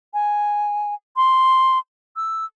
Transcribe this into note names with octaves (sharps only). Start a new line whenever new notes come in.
G#5
C6
E6